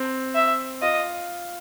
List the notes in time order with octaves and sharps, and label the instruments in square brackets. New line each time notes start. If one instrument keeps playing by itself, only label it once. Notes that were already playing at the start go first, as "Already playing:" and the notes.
Already playing: [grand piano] C4
[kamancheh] E5
[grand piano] F4 [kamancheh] D#5